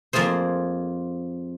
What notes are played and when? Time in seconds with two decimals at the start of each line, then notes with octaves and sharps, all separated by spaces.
0.13 F2 A#3 F4 G#4 C5